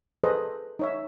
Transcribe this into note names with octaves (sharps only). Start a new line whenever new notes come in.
G#4 A4 B4 C5 D#5
D#4 C#5 E5